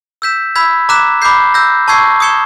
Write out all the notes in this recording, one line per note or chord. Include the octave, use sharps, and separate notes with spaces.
E6 G6 B6 E7
B5 E6 G#6 B6
A#5 D6 F#6 B6 E7
B5 D6 G6 C7
E6 G6 A#6
A5 C#6 E6 G#6 C7
D#6 G#6 C#7 E7 G7